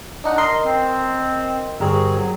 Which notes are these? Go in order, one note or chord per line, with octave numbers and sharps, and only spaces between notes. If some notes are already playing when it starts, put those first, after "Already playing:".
D4 D#4 F#5
A#4 D#5 C6
C4
G1 G3 C4 F#4 G#4 A#4
F#3